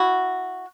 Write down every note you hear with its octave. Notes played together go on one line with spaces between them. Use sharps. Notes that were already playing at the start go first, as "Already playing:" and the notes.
Already playing: E4 F#4